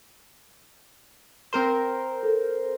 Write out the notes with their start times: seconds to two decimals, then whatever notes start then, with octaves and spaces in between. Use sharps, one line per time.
1.53 C4 A#4 C5
2.23 A4